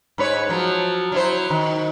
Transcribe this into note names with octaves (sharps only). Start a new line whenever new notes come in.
G#2 B4 C#5
F3 F#3
F#3 E4 C5
D#3